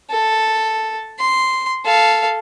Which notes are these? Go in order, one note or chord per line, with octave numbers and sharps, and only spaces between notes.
A4
C6
A4 F5